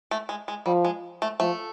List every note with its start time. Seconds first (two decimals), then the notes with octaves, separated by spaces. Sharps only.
0.11 A3
0.29 G#3
0.48 G#3
0.66 F3 G3
0.85 G#3
1.22 A3
1.40 F3 A3